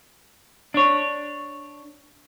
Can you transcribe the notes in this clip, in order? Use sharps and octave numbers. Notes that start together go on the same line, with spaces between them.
D4 C#5